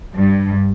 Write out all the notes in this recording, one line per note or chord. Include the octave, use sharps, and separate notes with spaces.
G2